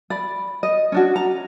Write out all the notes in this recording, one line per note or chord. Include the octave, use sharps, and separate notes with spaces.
D5 B5
D#5
C#4 D4 F#4
A#5